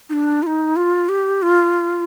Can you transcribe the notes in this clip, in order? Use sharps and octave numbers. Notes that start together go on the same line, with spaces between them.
D#4
D4
F4
D#4
F4
G4
F4